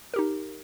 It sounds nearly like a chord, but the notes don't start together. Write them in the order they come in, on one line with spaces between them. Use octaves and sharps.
A#4 G4 D#4